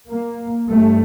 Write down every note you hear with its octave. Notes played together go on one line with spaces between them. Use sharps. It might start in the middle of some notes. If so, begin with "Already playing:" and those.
A#3
G2 A3